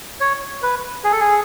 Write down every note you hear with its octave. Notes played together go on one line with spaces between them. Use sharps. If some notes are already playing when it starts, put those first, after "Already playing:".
C#5
B4
G#4
A4
G#4